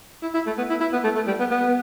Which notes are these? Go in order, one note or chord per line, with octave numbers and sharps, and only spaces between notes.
E4
E4
A3
B3
E4
E4
B3
A3
A3
G3
B3
B3